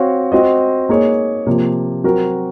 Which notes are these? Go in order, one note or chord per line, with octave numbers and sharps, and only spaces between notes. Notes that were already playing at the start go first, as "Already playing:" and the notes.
Already playing: C4 F#4 C#5 F5
C4 F#4 C5 D#5
A#3 D#4 G#4 C#5
C3 F3 A#3
F#3 C4 F#4 A#4